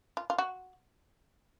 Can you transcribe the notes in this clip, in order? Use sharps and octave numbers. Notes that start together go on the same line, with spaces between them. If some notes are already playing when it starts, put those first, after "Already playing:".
F4
F4
F#4